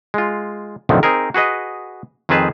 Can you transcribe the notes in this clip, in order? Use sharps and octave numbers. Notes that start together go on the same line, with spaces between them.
G#3 F4
B1 F2 A2 D3 D#3 F3
C4 D#4 G#4 A#4
F#4 G#4 B4 D#5
F2 D#3 C4 G#4 B4 A5